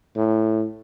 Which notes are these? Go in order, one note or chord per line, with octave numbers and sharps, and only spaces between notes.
A2